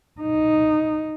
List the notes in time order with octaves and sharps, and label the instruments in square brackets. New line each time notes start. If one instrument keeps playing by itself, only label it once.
[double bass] D#4